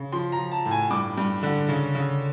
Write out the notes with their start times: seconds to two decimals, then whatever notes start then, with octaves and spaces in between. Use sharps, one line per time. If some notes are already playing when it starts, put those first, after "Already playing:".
Already playing: C#3
0.12 F3 C6
0.32 A#5
0.39 F3
0.52 A5
0.65 A2
0.71 G#5
0.90 G2 D6
1.18 G2
1.43 D3
1.69 C#3
1.95 C#3